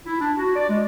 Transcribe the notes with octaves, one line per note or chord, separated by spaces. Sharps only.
E4
D4
F#4
D5
G#3